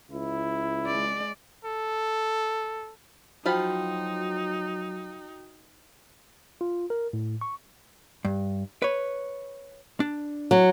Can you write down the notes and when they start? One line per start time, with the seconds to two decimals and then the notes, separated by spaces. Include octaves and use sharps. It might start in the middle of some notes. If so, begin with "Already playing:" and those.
0.11 C#2 E4
0.87 G#3 D5
1.65 A4
3.46 F3 F#3 D#4 F4 F#4 G5 B5
6.61 F4
6.90 A#4
7.13 A2
7.41 C#6
8.25 G2
8.82 B4 C#5
10.00 D4
10.51 F#3